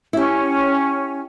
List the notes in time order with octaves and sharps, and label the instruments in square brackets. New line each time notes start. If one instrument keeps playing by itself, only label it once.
[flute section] C#4 [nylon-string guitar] E4 G4